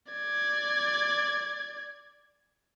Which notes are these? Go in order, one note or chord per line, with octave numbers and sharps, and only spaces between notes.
D5 G#6